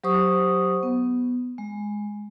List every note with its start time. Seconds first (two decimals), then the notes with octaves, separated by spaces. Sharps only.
0.04 F#3 G4 C5 C#6 D#6
0.83 B3
1.58 G#3